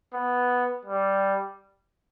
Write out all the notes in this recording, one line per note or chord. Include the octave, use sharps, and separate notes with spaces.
B3
G3